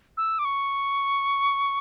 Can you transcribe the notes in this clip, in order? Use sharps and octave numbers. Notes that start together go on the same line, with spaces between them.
E6
D6
C#6